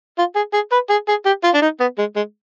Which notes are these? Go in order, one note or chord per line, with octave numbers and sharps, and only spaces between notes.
F4
G#4
G#4
B4
G#4
G#4
G4
F4
D4
D#4
B3
G#3
G#3